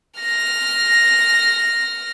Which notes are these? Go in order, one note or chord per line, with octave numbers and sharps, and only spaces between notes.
F6 A#6